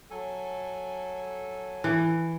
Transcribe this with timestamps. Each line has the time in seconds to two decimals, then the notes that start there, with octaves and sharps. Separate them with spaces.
0.10 F#3 A4 G#5
1.84 E3